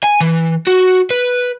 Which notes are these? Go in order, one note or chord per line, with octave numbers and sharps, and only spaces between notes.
G#5
E3
F#4
B4